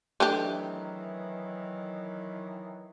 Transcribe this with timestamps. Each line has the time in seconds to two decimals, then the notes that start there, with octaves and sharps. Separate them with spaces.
0.20 D#3 E3 F#3 A3 D4 G4